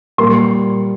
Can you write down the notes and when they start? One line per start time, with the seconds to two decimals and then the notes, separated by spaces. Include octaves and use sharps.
0.18 A#2 G3 A#3 C6